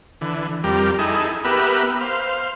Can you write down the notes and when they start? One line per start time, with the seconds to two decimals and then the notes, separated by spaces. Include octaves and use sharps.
0.21 D3 E3
0.64 F2 G3 G4 A#4
0.99 D#4 E4 G#4 A4
1.45 B3 G4 A#4 B4 E5
2.01 C5 F5